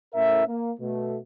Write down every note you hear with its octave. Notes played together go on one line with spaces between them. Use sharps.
A2 C#4 A#4 E5
A#3
B2 A3